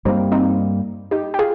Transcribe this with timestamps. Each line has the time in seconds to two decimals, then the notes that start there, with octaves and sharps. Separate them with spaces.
0.05 G2 G3 A#3 C4 D#4
0.32 C4 D#4
1.11 D#4 G4
1.34 G4
1.39 F4 G#4